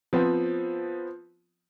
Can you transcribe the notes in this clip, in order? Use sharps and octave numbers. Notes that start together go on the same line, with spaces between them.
F3 B3 C4